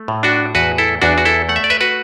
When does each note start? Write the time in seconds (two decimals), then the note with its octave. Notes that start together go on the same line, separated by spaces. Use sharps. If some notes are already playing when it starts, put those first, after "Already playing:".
Already playing: A3
0.08 A2
0.23 D4 F#4
0.55 E2 F#4 B4
0.78 E4 A4
1.02 E2 D4 F#4
1.18 F#4
1.25 E4 A4
1.49 A3 F#5
1.56 E5
1.64 D5
1.70 B4 E5
1.81 F#4 B4